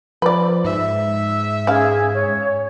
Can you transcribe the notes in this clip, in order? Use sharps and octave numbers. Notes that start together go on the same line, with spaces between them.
F3 B4 D5
G#2 E5
C#4 G#4 F5
C#5